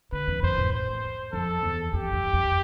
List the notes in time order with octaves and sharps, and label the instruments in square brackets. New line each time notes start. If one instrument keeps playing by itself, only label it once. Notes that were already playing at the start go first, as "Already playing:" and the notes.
[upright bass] D3 [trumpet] B4
[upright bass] F2
[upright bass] F2 [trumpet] C5
[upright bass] A2
[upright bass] A2 [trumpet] C5
[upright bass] F2 [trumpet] A4
[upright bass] E2
[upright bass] F2 [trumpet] G4
[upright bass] G2
F2